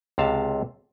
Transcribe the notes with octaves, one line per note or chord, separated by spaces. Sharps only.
C#2 C3 F5 A5